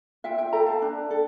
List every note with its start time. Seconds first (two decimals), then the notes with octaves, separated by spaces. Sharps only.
0.24 F4 E5 G5
0.38 E5 G5
0.53 A4 G5 A#5
0.66 F5 A5
0.82 D4
1.10 A4